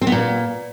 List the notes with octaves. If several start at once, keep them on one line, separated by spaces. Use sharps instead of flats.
C4
B3
A#2